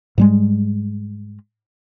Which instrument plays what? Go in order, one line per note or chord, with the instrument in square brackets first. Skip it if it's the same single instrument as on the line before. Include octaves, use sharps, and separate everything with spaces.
[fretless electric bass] G#2 G3 G#3